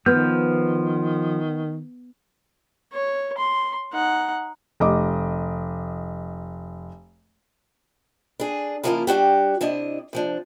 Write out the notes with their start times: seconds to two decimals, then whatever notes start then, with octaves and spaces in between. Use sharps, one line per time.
0.06 D#3 F3 B3 F6 G6
2.93 C#5
3.38 C6
3.93 D#4 F#5
4.80 F1 D#5 D6
8.40 D4 G#4
8.83 C#3 F3 A#3 E4 F4 A#4
9.07 G3 D4 F#4 G4
9.61 C3 D4 E4 D#5
10.13 C3 F3 D4